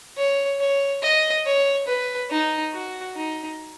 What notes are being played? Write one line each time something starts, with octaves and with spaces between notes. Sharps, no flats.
C#5
C#5
D#5
C#5
B4
D#4
F#4
D#4